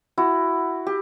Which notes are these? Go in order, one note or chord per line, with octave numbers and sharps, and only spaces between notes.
E4 F#4
G4